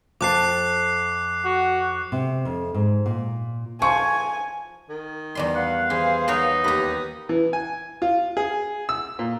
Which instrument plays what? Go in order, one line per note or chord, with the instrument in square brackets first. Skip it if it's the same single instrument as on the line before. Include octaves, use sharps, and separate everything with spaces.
[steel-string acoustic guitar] F2 A5 [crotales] D6 F#6 C7
[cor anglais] F#4
[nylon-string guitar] C3
F2
G#2
A#2
[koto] F3 [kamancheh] G#5 [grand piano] C#6
[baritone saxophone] D#3
[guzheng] E2 G3 C6 [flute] D#5
[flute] F5 [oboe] F#5
[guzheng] E3 [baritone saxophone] G#4 [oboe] C5
[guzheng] B3 A#4 C#5 [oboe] D#4
[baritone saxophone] D#2 [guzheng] G4 B4 [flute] D#6
[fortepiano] E3
G#5
F4
G#4
E6
A#2